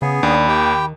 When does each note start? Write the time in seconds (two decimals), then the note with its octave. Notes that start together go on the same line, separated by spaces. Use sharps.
0.02 C#3 B3 G#4
0.23 D#2 D4 B5
0.49 D#3 G4 G5